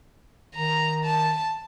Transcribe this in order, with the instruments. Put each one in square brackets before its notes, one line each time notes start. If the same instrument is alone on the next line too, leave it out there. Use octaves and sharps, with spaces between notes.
[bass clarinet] D#3 [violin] A#5
[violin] A5